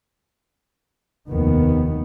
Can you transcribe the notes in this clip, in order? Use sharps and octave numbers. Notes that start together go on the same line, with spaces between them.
F1 D#2 D#3 B3